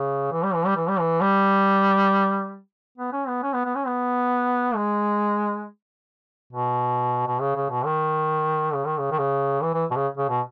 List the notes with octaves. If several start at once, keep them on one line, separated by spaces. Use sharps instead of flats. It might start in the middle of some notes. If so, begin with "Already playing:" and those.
Already playing: C#3
E3
G3
E3
G3
E3
G3
E3
G3
B3
C#4
B3
C#4
B3
B3
C#4
B3
G#3
B2
B2
C#3
C#3
B2
D#3
C#3
D#3
C#3
D#3
C#3
E3
E3
B2
C#3
C#3
B2